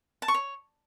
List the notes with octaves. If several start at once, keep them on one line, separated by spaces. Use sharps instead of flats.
A5
C#6
C#5